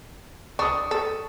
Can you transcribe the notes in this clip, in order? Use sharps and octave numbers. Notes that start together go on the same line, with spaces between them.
D4 C#6 D#6
A4